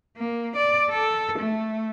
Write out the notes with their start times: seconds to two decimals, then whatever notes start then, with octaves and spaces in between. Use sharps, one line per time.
0.17 A#3
0.56 D5
0.90 A4
1.38 A3